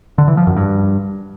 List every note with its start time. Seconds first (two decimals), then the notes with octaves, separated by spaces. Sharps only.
0.18 D3
0.28 E3
0.37 F3
0.47 F#2
0.56 G2